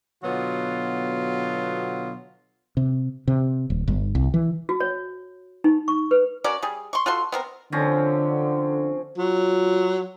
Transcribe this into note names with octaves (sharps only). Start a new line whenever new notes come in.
B2 D3 F#3 B3 F4
C3
C3
D#1
G1
C2
E3
F#4
C#5
D#4
C#6
B4
C#4 F#4 A#4 D5
G3 G#4
C6 C#6
F4 F#4 A4 C6
B3 C4 A#4
D3 F3 C4 C#4
F#3 F4